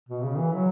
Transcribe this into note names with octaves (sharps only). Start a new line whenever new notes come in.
B2
C#3
E3
F#3